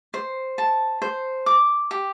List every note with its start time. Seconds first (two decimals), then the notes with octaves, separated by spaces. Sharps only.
0.14 C5
0.58 A5
1.02 C5
1.46 D6
1.91 G4